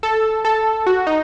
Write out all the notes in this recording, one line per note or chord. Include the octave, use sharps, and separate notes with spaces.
A4
A4
F#4
D#4